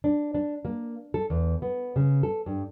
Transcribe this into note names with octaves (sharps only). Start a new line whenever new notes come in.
D4
D4
A#3
A4
E2
B3
C#3
A4
G2